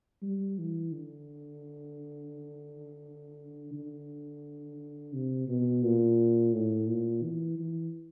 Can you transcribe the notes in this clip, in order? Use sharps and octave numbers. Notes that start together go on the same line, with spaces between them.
G3
E3
D3
D3
C3
B2
A#2
A2
A#2
E3
E3